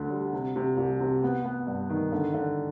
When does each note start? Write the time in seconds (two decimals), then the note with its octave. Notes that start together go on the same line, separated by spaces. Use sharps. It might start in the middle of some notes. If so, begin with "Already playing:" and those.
Already playing: D2 D3 D4
0.10 G3
0.33 C3
0.56 C3
0.77 C2
1.00 C3
1.23 B3
1.45 B3
1.67 G2
1.89 D#3
2.12 D3
2.34 D3